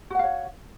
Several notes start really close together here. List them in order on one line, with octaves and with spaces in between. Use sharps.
F#4 F#5 F5 C#5